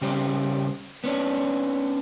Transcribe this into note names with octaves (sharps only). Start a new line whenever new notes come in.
C#3 G3 C#4 G4 C5
B3 C#4 D4